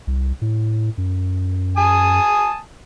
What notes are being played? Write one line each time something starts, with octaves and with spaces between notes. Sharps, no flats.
C2
A2
F#2
G#5 A5 D#6